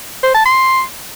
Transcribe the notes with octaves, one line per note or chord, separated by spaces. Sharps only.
C5
A5
C6